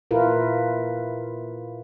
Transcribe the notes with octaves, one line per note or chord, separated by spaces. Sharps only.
A#2 E4 F4 A#4 B4